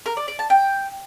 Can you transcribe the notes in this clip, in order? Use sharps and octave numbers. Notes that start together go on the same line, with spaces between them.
A#4
D5
D5
A5
G5